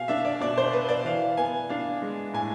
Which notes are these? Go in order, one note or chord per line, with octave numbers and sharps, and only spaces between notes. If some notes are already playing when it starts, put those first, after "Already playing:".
Already playing: B2 F5 G#5
D4 E5
D5
B2 D5
C5
B3 B4
D5
E3 F5
B3 G#5
D4 F5
G#3
A2 G#5